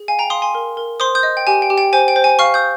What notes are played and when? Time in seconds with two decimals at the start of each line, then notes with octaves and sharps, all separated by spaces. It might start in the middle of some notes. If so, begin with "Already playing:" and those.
Already playing: G#4
0.08 F5 G#5
0.19 G5 A#5
0.30 F5 C6 D#6
0.42 G#5 C6
0.55 A#4
0.77 A#4
1.00 C5 C6 D#6
1.15 D#6 G6
1.23 D#5
1.37 G5
1.47 G4 G#5
1.62 G5
1.70 G4
1.78 G5
1.93 C5 G#5
2.08 G5
2.16 C5
2.24 G#5
2.39 F5 C#6 F6
2.54 D#6 G6